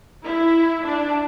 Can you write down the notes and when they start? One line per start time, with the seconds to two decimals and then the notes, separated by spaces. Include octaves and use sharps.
0.24 E4
0.84 D4